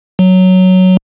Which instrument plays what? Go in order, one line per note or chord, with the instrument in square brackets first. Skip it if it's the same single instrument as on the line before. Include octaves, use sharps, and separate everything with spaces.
[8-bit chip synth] F#3